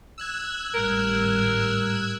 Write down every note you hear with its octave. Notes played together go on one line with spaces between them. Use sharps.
E6 F#6 G#6
G#1 A2 G3 A#4